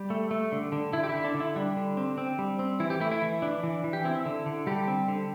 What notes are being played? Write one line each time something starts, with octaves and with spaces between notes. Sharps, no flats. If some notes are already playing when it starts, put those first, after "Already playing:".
Already playing: G3 G4
A3
A3
D3
D3
D3 E4
G4
E4
D3
D4
D3
E4
G3 D4
D3
C4
C4
G3
C4
E3 E4
G4
A3 E4
E4
E3
E3 D4
E3
E3
G4
C4 E4
D3
D3
D3 G3 G4
C4
D3